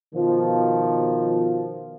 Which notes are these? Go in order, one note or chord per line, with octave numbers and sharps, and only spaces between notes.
B2 D#3 F3